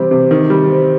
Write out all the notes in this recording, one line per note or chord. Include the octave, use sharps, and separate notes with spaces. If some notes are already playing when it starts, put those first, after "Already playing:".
Already playing: C3 E3 G3 C4
C3
D#3
G3
C4